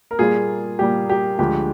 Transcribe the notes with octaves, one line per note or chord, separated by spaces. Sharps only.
A#4
A#2 G3 A#3 F4 G#4
A#2 G3 A#3 G4
G4
D2 D3 F3 G#3 G4